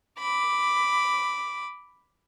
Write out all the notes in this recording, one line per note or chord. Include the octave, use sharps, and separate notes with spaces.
B5 D6